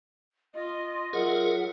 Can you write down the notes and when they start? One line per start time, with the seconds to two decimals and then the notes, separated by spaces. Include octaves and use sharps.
0.54 F4 D#5 C6
1.13 F#3 F4 G#4 A#4 E5 F#5